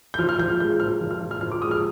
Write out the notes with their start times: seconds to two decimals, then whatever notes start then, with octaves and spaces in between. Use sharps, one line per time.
0.14 G6
0.19 F3 F6
0.29 F6
0.39 F3 G6
0.49 F6
0.60 G#3 G6
0.80 F3 F6
1.01 F3
1.11 F6
1.21 F3
1.31 F6
1.41 F3 F6
1.52 D6
1.62 G#3 D#6
1.71 F6